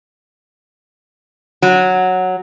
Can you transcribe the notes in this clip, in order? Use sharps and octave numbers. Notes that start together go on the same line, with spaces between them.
F#3